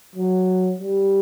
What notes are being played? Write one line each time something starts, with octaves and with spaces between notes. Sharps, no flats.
F#3
G3